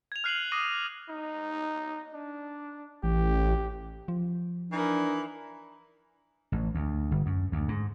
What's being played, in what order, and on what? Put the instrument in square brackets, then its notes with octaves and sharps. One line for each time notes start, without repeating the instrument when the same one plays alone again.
[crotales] G#6 F7
F6 F#6 C7 D#7 F7 F#7
D6 D#6 F#6 A#6 C7 D#7
[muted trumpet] D#4
D4
[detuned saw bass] A1 [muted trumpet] G4
[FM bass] F3
[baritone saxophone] E3 [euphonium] D4 [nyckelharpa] D#4 A#4
[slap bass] A1
D2
G1
F#2
D2
G#2